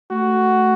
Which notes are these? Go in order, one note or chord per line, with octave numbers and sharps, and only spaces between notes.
A3 F#4